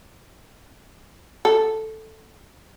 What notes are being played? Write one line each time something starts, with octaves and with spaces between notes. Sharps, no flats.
A4